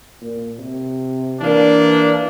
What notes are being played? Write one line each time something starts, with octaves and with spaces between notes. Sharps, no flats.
A#2
C3
E3 A#3 D4